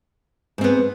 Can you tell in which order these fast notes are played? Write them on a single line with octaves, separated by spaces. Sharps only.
G#2 C4 B3